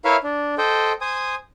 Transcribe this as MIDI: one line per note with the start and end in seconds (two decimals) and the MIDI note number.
0.05 0.17 64
0.05 0.17 70
0.05 0.17 71
0.05 0.17 73
0.05 0.17 76
0.05 0.17 77
0.23 0.55 62
0.58 0.92 69
0.58 0.92 72
0.58 0.92 75
0.58 0.92 79
1.01 1.35 72
1.01 1.35 80
1.01 1.35 87